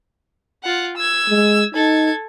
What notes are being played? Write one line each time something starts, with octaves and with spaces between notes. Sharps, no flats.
F4 F#5
E6 G#6
G#3
D#4 A4 G#6